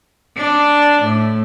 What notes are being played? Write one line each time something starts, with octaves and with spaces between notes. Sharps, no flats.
D4
A2